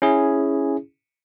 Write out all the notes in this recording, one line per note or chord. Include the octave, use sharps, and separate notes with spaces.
C#4 E4 G#4